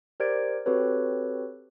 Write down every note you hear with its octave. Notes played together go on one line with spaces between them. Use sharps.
G4 A#4 C5 D5 G#6 D7
C4 F#4 G4 A4 B4 C#5